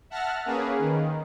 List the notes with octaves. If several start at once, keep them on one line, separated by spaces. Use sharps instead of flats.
E5 F#5 A5 F6 A#6
A#3 C#4 G#4 B4
D#3